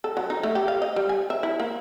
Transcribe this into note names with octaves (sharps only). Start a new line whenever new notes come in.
A4
F#3
D#4
A3
G4
F5
D#5
G3
G#5
E5
E4
A#3